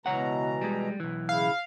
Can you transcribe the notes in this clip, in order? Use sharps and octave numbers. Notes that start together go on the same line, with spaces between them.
C#2 B2 E3 C#5 F#5 A#5
G3 G#3
B1 E3
C#3 E4 F5